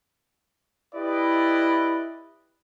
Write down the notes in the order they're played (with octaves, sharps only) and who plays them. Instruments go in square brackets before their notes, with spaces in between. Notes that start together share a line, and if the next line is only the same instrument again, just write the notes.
[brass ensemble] E4 G4 B4 D5 D#5